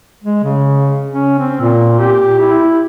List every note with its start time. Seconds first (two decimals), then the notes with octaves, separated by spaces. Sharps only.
0.24 G#3
0.44 C#3
1.12 C#4
1.39 C4
1.61 A#2
2.00 G4
2.39 E4